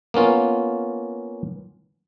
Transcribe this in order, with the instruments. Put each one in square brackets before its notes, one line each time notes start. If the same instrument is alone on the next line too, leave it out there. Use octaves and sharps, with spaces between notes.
[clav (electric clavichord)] A#3 B3 C#4 F4